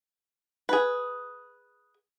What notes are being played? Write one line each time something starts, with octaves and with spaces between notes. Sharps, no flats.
G#4 B4